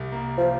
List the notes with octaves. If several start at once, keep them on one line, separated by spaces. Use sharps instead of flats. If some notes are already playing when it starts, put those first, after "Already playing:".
Already playing: C2 G3
A#3
F3